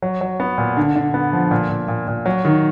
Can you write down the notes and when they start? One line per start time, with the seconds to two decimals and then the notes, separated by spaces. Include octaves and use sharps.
0.02 F#3
0.21 F#3
0.40 B3
0.58 A#2
0.77 D3
0.95 D3
1.14 B3
1.33 F3
1.51 A#2
1.69 A#2
1.88 A#2
2.08 A#2
2.26 F#3
2.45 D#3